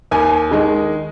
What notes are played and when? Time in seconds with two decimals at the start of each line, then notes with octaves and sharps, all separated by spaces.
0.11 D#2 G#5
0.51 D#3 G#3